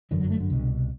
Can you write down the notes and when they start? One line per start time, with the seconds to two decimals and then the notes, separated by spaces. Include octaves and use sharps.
0.11 G1 F#2 D3 E3
0.20 F#3
0.30 A3
0.40 D3
0.50 C2 B2